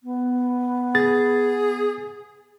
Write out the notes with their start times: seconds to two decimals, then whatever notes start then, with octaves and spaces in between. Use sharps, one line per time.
0.03 B3
0.95 G#4 A6